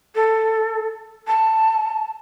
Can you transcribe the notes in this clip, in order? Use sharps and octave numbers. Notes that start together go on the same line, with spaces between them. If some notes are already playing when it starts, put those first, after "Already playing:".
A4
A5